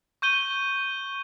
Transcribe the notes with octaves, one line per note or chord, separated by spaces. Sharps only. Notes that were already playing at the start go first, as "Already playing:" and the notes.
C#6 G6 D#7 G7